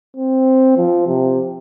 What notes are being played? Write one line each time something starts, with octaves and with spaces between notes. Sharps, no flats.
C4
F3
C3